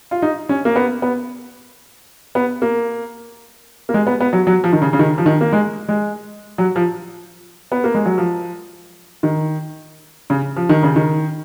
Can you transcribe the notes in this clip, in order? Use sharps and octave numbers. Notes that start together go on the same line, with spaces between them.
F4
D#4
C#4
A#3
B3
B3
B3
A#3
A#3
G#3
B3
B3
F#3
F#3
F3
D#3
C#3
C#3
D#3
F3
D#3
A#3
G#3
G#3
F#3
F3
B3
A#3
G#3
F#3
F3
D#3
C#3
F3
D#3
C#3
D#3